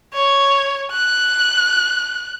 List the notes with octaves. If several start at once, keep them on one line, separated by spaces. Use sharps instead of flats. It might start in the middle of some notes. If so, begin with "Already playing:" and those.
C#5
F#6